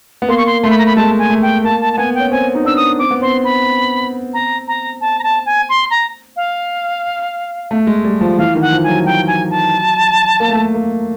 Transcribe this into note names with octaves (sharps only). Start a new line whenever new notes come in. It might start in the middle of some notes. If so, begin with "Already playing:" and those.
B3
A#3 C6
C#6
C6
A3 C6
B5
A#5
B5
G#3 A5
G#5
A3
G5
A#3 A5
A5
A5
B3 G#5
C#4 G5
C4 G#5
D#4
D4 E6
D#6
C4 D6
B3
C4 C6
B5
A#5
A#5
A5
A#5
A5
G#5
C6
A#5
F5
A3
G#3
G3
F3
E3 F5
D#3
F#5
F3
F#3 G#5
F#3 G5
G#5
A5
A#3
A3
A#3
A#3